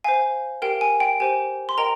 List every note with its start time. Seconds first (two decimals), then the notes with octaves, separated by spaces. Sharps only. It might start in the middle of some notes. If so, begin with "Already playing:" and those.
0.04 C5 F5 G#5
0.62 G4 A#4 F5 G5
0.81 G#5
1.00 G5
1.20 G4 C5 G5 G#5
1.69 C6
1.78 A#4 D#5 G5 A#5